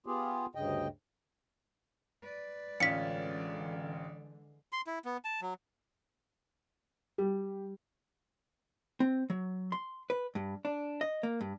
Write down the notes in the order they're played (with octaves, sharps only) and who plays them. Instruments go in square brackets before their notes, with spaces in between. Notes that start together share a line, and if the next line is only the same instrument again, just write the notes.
[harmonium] B3 F4 G4 G#4
D2 G2 C#3 D#5 G5
[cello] B4 D5
[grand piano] A1 C#4 F4 [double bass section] D3 E3 G#3 [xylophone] B6 C#7
[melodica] C6
E4
B3
A5
F#3
[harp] G3 [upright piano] G4
[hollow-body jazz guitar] C4
F#3
C6
B4
G2
D4
D#5
A#3
G2